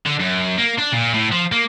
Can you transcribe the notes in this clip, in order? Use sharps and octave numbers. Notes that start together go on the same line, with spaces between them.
D3
F#2
A#3
D4
A#2
A2
F3
A#3